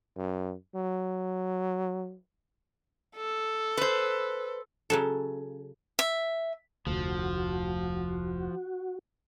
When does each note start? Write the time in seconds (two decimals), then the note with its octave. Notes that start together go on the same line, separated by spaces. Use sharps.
0.16 F#2
0.75 F#3
3.16 A4
3.77 B4 C5
4.90 C#3 F#3 A4
5.99 E5
6.87 F1 D2 F3 F#4